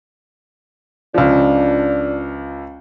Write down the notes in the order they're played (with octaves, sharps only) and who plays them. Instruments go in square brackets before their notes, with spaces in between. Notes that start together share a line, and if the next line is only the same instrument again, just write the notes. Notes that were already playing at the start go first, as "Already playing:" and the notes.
[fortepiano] C#2 F3 [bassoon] D4